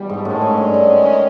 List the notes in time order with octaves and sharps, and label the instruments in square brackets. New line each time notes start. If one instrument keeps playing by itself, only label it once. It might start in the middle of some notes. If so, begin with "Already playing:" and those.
Already playing: [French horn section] E2 B2 G3
[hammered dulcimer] G#2
[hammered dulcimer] A2 [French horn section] D#3 G#3 C#4
[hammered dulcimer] G#2
G2
G#2